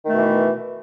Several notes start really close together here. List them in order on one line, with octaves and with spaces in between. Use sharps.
D#3 A3 B2 E3